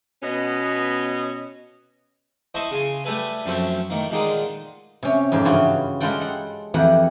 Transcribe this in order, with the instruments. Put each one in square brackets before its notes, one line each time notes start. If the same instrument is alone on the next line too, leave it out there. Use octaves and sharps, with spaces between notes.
[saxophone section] B2 B3 C#4 D#5
[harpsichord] E4 C5 D#5 A5 C#6
C#3 G#5 C6
G3 A3 A4 B4 G#5
F#2 F3 A3 C4 C#4
A2 D#3 A#3
A#2 D3 D#3 G#3 D#4 F4
[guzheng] C3 C#4
F2 G#2 G4 G#5
G2 C#3 E3 F4 F#4
G3 G#3 F4 A4 F#5 G5
F#5
F2 E3 G4 F#5